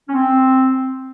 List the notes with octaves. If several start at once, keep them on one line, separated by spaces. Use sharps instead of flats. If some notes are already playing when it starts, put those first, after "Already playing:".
C#4
C4